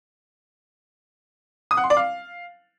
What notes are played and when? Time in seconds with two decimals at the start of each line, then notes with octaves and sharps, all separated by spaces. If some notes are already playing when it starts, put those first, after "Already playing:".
1.71 D#6
1.77 F#5
1.84 C6
1.90 D5
1.97 F5